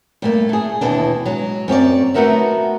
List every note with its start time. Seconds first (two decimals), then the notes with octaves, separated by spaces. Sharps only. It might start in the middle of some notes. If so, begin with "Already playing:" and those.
0.22 G2 A3 A#3
0.49 A3 G#4
0.81 D#2 B2 E3 D4
1.25 F#3 G#3
1.68 F#2 C4 C#5 D5
2.14 A3 B3 D#4 F#4 A#4 E5